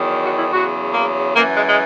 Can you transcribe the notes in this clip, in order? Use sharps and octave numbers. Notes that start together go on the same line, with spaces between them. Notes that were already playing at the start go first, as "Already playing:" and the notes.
Already playing: E2 D#3 F#3
F#4
E4
E2 C#3 F#3 F#4
A#3
F#2 E3 A#3
G#3
G#3